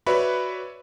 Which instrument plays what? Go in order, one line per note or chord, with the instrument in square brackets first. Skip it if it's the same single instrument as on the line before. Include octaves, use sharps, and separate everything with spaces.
[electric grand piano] F#4 B4 C#5 D5 E5 B5